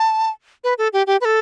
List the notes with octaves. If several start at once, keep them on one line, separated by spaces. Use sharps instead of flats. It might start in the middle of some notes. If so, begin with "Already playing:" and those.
Already playing: A5
B4
A4
G4
G4
B4
A4